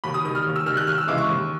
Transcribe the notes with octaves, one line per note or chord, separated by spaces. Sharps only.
D#2 B5
D#6
D#3 G3 D#6
F6
D#2
E6
D#3 G3 F6
F#6
D#2 F6
E6
C#3 E3 G#3 D6
C#6
D#2